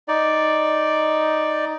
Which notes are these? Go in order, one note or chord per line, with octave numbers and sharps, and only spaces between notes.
D#4 D5